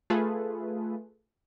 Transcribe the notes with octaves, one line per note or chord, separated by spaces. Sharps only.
A3 F4 G#4 A4 B4